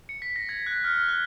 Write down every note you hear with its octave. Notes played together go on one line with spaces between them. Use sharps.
C#7
B6
A#6
G#6
F#6
F6
F6
F#6